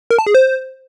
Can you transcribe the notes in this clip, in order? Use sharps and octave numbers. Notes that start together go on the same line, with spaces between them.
A#4
A5
G#4
C5